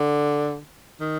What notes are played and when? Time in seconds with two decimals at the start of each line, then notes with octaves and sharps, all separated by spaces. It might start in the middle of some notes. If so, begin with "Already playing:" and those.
Already playing: D3
1.01 D#3